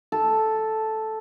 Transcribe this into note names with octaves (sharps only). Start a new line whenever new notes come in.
A4